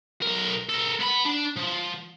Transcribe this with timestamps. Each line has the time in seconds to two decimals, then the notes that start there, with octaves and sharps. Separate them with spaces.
0.22 B1 A#4
0.69 A4 A#4
1.01 B3 B5
1.26 D4
1.57 F3